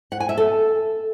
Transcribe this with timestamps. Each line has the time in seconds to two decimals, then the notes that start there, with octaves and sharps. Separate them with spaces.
0.12 F#5
0.20 G#5
0.29 E5
0.38 A4